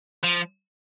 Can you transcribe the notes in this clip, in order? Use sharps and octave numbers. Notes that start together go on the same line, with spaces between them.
F3